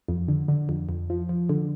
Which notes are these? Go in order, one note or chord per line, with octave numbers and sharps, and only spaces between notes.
F2
D3
D3
F2
F2
F3
F3
D3